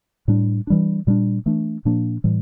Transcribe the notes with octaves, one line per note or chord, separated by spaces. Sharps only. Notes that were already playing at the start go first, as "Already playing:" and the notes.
A2 G3 D4
E3 G3 D4
A#2 G3 D4
E3 A3 D4
A#2 F3 A#3 D4
A2 E3 G3